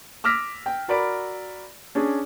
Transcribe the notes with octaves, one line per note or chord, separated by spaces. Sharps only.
D6 E6 F6 A#6 B6
G5
F#4 A#4 D5 B5 D7
C#4 D4 G#4